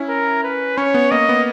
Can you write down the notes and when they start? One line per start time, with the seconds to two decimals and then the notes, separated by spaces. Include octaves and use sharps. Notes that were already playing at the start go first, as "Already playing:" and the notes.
Already playing: C#4 E4
0.09 A#4
0.44 B4
0.77 C#4 C#5
0.94 B3
1.11 A#3 D#5
1.29 B3